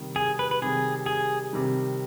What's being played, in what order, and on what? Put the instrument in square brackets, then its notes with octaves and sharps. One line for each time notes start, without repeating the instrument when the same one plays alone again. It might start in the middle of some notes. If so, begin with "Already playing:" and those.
Already playing: [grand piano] C3 D#3 G3
[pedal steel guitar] G#4
B4
B4
[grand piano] C3 D#3 G3 [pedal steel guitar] G#4
[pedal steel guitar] G#4
[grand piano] C3 D#3 G3